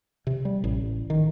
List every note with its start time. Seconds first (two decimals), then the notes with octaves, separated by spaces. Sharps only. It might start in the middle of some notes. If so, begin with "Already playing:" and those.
0.27 C3
0.45 G3
0.64 A1
1.10 D#3